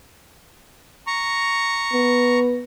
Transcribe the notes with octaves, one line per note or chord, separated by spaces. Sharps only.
A#5 C#6
B3